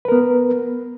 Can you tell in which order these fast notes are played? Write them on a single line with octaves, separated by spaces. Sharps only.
B4 A#4 B3